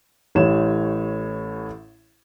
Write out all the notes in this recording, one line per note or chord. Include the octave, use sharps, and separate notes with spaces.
A1 A2 G4 C#5 E7